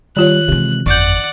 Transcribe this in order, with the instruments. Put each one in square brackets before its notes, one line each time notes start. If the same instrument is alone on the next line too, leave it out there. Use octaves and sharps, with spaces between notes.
[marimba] D#3 F4 C#5 [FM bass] G3 [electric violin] F#6
[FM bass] C3 [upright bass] E3 G#3
[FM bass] G1 [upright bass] F2 [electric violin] D5 F#5 [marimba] C#6 G6